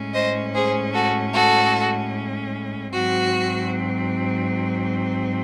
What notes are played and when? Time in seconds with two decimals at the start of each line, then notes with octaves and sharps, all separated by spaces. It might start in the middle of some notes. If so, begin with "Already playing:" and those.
Already playing: A2 G#3 C#4
0.13 C5 D#5
0.54 G#4 C5
0.94 F#4 A4
1.33 F#4 A4
2.93 G#2 F#3 C4 F#4